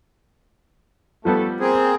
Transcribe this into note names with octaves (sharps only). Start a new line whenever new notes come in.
F3 G3 A3 B3 A4
A#3 C4 G#4